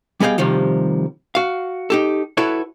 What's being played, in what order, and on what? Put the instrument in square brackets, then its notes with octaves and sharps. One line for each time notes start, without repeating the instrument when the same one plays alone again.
[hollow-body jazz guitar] G3 B3 G#4 D#5 F5 G5
C3 D#3 F3 G3
F#4 F5
D#4 G4 A4
E4 F#4 A4 B4 C#5